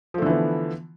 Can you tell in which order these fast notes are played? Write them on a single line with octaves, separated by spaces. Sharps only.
F3 A3 D3 E3 B3